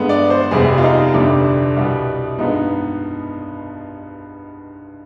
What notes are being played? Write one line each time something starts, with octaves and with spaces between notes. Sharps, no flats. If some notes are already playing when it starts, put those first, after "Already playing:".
Already playing: G2 D3 G#3 B3
D5
C5
F1 F2 C3 G3 B3 G#4
F4
D#4
G1 F2 C3 G3 D4
C2 B2 G3 B3
G2 F3 G#3 B3 D#4